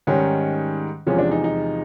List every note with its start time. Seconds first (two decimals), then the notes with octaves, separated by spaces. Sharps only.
0.07 G#2 D#3 G3 C#4
1.07 E2 C3 F3 G#3 C#4
1.19 D4
1.31 D#4
1.44 D#4